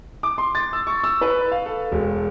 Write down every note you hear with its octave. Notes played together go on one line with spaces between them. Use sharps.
D6
C6
A6
E6
C#6
E6
B4
F5
A4
E1